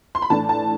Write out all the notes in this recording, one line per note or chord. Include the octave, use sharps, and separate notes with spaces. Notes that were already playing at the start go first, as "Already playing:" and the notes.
C6
B5
A2 E3 A3 D4 A5
A5